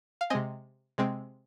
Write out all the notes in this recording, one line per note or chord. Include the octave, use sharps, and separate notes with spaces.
F5
C3 G#3 C4 D#5 G#5
C3 G#3 C4